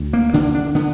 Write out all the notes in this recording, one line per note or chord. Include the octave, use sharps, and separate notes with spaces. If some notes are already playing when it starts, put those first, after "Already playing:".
Already playing: D2
A#3
D3 D4
D4
D3 B3